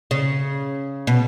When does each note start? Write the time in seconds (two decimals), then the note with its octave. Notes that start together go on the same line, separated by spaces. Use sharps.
0.11 C#3
1.07 B2